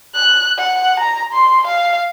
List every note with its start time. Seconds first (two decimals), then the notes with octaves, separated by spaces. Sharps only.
0.15 F#6
0.58 F#5
1.00 A#5
1.33 C6
1.67 F5